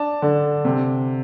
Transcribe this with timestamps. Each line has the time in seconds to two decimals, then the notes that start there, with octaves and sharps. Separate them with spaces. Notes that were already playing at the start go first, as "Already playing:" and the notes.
Already playing: D4 A5
0.22 D3
0.65 C3